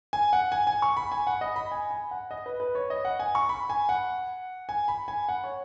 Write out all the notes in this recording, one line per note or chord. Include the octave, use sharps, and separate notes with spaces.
G#5
F#5
G#5
G#5
C#6
B5
G#5
F#5
D#5
B5
G#5
G#5
F#5
D#5
B4
B4
C#5
D#5
F#5
G#5
C#6
B5
G#5
F#5
G#5
B5
G#5
F#5
C#5